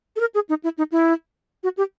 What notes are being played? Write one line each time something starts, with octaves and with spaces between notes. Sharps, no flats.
A4
A#4
G#4
D#4
E4
D#4
E4
F#4
G4